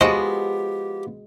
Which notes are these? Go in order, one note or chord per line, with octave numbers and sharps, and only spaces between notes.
F3 G#3 B3 F#4 G4 C5 D#5